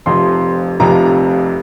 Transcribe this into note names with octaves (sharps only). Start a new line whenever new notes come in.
F1 F2 C3 F3 C6
F1 F2 C3 F3 A#5